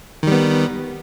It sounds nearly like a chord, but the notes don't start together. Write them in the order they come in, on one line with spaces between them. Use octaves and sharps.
D#3 G3 B3